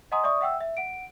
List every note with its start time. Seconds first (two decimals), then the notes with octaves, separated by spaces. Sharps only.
0.12 D#5 F#5 G#5 A#5 C6 D#6
0.24 D5 E5 C#6 D#6
0.41 E5 F#5 G5 E6
0.60 E5
0.77 F#5 D7